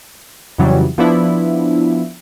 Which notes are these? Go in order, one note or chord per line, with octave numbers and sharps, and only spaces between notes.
F2 C#3 E3 F#3 G3
F3 B3 D4 E4